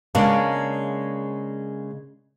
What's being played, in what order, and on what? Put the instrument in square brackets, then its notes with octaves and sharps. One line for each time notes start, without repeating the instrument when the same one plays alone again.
[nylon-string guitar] C#3 G#3 A#3 D4